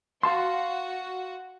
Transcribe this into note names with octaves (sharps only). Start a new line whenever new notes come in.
F#4 F5 A5 C6